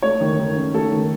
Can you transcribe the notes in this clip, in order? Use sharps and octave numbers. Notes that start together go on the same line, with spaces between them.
A3 C#5
D#3
D#3
C#4
A3 A4
D#3